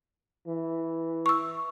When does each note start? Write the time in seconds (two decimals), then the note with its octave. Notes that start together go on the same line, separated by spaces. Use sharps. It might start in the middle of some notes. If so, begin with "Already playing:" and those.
0.47 E3
1.26 C#6 E6